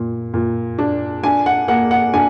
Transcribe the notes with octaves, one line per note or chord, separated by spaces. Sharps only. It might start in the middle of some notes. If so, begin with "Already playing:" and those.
Already playing: A#2
A#2
D4
D4 G#5
F#5
A#3 F#5
F#5
D4 G#5